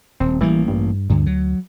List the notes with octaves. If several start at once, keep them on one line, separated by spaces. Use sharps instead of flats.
D#1 C4
A1 E3 G3 A#3
G2
D2 G2 D3
F#3